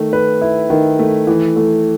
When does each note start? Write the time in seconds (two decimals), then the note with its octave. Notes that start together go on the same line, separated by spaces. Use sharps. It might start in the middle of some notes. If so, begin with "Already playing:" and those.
Already playing: D#3 A3
0.13 B4
0.42 E4
0.70 D#3
0.99 A3
1.27 E3
1.56 A3